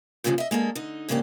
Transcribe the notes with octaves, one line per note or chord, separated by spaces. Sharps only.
G2 A#2 C#3 E3 F3 G3
D#5 E5
G#3 A#3 D4 A4
D3 D#4
G#2 C#3 E3 A#3 D4 G4